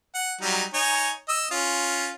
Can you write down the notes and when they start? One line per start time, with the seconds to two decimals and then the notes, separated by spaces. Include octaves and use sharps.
0.14 F#5
0.41 F#3 G3 D#4
0.74 D#4 C#5 G#5
1.29 D#5 E6
1.51 C#4 F4